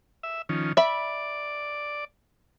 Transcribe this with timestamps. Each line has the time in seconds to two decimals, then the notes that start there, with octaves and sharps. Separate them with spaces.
0.23 E5
0.49 D#3 F3 C#4
0.77 D5 E5 B5